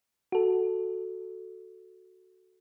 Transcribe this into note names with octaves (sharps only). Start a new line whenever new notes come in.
F#4 A4